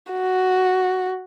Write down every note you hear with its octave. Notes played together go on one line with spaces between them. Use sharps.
F#4